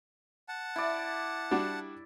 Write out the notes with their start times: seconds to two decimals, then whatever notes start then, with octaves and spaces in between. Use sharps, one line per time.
0.49 F#5 A5
0.76 E4 D5
1.51 G3 D4 F#4